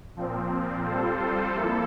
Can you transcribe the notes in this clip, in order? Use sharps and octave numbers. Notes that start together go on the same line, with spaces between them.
A#2 F3 C4
G3 C4 F4 A4 C5
F3 A#3 E4 A4